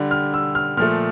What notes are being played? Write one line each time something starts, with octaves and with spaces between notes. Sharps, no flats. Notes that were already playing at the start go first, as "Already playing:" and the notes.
Already playing: D3 G3
F6
E6
F6
A#2 F3 A3 F6